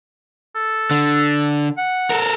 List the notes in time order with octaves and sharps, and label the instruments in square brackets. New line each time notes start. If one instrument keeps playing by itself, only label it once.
[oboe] A4
[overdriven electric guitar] D3
[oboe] F#5
[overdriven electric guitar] A4 A#4